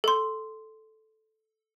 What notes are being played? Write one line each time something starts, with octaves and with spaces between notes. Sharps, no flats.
A4 C6